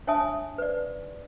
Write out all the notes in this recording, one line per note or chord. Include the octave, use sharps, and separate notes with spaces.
D4 C#5 E5 G#5 A5 D#6
B4 D5